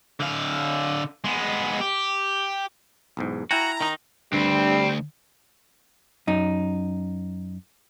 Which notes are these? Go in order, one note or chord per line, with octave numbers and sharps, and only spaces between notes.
D3 F5
G#3 B3
G4
B1 E2 G#2
E4 F#4 G5 G#5 A#5
D#3 D#4
D2 G2 G3 C4
F#2 D#4